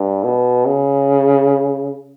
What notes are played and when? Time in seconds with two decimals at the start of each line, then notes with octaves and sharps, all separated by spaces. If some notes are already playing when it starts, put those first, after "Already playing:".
Already playing: G2
0.24 B2
0.66 C#3